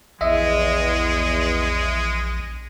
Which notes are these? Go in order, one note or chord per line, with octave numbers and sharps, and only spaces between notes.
A#1 E2 G#3 D#5 E5